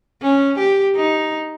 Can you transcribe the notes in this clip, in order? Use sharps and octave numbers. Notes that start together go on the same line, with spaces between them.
C#4
G4
D#4